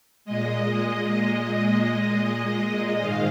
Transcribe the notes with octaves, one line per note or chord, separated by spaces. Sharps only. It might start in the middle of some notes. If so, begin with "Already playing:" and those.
A#2 G#3 D#5
D#5
G#2 D#3 F5